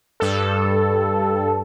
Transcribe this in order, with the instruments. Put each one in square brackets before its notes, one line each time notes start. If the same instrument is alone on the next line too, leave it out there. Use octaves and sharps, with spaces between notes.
[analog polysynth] G2 A4